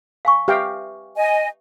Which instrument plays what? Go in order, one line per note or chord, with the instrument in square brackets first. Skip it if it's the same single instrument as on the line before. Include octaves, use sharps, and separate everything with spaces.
[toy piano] F5 G#5 C#6
[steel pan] G4 F5 G5 [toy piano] B4 E5
[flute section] D#5 G#5